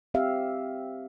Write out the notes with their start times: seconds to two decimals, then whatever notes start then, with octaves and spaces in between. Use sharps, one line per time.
0.14 C4 G4 E5 F5